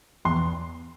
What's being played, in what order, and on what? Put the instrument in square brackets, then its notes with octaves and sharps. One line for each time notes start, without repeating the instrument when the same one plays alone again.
[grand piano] E2 C6